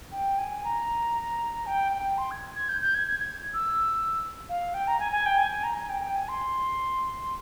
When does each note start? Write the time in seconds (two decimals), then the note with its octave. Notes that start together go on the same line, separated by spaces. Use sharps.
0.12 G5
0.38 G#5
0.64 A#5
1.66 G5
1.92 G5
2.17 C6
2.31 G#6
2.55 G#6
2.69 G6
2.81 G6
2.94 G#6
3.07 G#6
3.20 G#6
3.54 E6
4.49 F5
4.74 G5
4.87 A#5
4.99 G#5
5.12 G#5
5.26 G5
5.38 G#5
5.52 G#5
5.63 A#5
5.76 G#5
5.89 G5
6.02 G5
6.16 G#5
6.28 C6